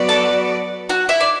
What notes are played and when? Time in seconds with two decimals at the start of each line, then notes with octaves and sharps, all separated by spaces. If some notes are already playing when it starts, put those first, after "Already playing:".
Already playing: F#3 B3 F#4 B4 D5
0.09 A4 A5
0.89 F#4 F#5
1.09 E4 E5
1.20 D5